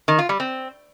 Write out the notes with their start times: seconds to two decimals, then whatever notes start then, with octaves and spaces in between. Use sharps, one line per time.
0.08 D#3
0.19 F4
0.29 G3
0.40 C4